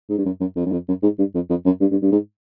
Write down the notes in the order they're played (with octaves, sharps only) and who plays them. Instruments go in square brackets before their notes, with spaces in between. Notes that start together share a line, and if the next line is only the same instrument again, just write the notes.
[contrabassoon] G#2
G2
F#2
F#2
F2
F#2
F2
F#2
G#2
G2
F2
F2
F#2
G2
G2
G2
G#2